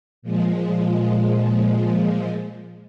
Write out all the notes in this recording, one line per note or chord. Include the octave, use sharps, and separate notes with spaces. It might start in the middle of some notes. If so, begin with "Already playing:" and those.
A#2 F3 G#3